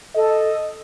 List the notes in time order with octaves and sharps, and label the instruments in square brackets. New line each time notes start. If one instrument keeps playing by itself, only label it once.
[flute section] A4 [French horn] D#5